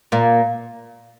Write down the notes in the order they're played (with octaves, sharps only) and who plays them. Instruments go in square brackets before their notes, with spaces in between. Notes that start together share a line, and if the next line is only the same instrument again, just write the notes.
[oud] A#2 A#3